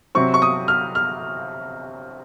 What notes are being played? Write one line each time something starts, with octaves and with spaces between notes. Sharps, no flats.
C3 F#3 C4 C#6
C#6
D#6
F6
F6